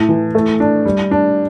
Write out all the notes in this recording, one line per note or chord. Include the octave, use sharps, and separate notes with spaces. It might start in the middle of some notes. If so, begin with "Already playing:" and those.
Already playing: A2
E3
A3
D4
G3
D4